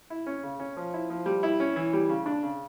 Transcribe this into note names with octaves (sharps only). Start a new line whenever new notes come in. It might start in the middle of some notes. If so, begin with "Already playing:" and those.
E4
C#4
C#3
C#4
F3
E4
F3
G3
E4
C#4
E3
G3
C#3
D4
C#3